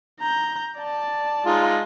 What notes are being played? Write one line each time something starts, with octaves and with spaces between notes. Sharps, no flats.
A#5 G6
D5 A5
G#3 D#4 F4